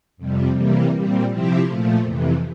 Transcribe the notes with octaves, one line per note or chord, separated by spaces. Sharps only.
F2 C3 G3
C3 E3 G3 A#3
A#2 G3 C4
C3 F3 C4 E4 G4
A#2 F3 A3
F2 C3 E3